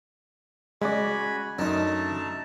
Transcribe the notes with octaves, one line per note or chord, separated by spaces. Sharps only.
C#3 G#3 F#4 D5 G#5 B5
F#2 A3 D4 D#4 A5 A#5